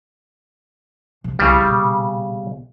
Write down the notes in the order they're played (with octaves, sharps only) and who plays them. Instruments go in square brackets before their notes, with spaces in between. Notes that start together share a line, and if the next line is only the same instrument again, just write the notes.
[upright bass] C3 F3
[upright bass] C2 E4 [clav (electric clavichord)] C#3 G3
[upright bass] A#1 B2